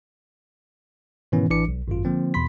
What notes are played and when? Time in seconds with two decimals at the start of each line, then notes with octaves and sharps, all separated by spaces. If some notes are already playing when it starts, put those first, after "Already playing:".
1.32 G#2 B2 D#3 E3 B3 C#4
1.50 A1 E3 D4 D6 C#7
1.68 B1
1.88 G#1 F#2 F4
2.05 D3 F3 A#3 C4
2.34 E2 B2 B5 C6 B6